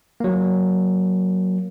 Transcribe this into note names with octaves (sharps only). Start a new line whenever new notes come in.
F#3 A#3